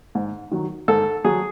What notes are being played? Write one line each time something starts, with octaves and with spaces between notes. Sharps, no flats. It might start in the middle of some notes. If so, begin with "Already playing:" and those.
G#2
D#3 F#3
G#2 A4
F#3 G#4